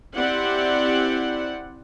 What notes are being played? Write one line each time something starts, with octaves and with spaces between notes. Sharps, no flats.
C4 E4 G4 C5 D5 F#5